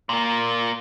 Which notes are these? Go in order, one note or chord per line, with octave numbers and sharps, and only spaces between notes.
A#2 A#3